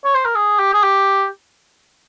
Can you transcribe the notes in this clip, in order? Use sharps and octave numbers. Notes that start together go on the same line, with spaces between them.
C#5
C5
A#4
G#4
G4
G#4
G4